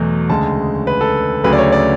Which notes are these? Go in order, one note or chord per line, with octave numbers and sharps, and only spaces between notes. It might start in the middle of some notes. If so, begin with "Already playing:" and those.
Already playing: E2 B2 F#3 A3
D2 C#3 G#3 A5
B4
A4
D2 C#3 F#3 A3 B4
D5
C#5
D5